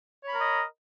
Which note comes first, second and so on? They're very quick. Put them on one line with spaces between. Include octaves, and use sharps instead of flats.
C#5 B5 A#4 A#5 D#5